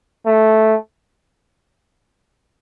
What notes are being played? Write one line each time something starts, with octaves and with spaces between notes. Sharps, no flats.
A3